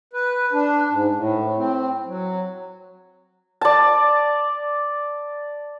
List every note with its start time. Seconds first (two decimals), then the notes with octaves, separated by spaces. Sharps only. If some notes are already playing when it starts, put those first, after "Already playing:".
0.13 B4
0.53 D4
0.90 G#2
1.16 A2
1.57 C4
2.06 F#3
3.61 D5 A5